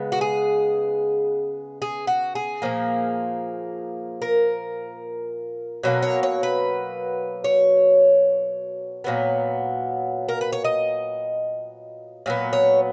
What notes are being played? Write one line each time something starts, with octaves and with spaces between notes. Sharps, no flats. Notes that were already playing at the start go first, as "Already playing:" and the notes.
Already playing: C#3 G#3 B3
F#4
G#4
G#4
F#4
G#4
A#2 F3 A#3
A#4
B2 F#3 A#3
C#5
C#5
B4
C#5
A#2 F#3 B3
A#4
B4
C#5
D#5
A#2 F#3 B3
C#5